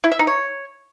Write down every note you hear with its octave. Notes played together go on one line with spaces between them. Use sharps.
E4
E5
D#4
C#5